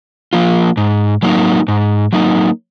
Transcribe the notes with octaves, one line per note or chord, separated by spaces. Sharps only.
F3 A#3 F4
G#2
F#3 A#3 D#4
G#2
F#3 A#3 D#4